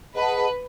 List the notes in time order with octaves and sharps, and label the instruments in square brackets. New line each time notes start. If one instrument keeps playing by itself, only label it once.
[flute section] G#4 D#5 F#5 A5 [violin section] B4